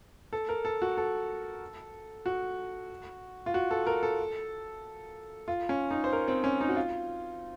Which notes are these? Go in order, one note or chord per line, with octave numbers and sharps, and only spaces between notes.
A4
A#4
A4
F#4
A4
F#4
F4
F#4
A4
A#4
A4
F4
C#4
D#4
C5
A#4
C4
C#4
D#4
F#4
F4